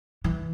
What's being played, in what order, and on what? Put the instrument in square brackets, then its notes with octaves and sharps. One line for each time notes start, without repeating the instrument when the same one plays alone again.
[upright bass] E3